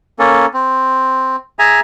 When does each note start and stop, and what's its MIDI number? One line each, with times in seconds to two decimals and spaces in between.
0.19 0.46 58
0.19 0.46 61
0.19 0.46 69
0.54 1.36 60
1.59 1.80 68
1.59 1.80 76
1.59 1.80 80
1.59 1.80 82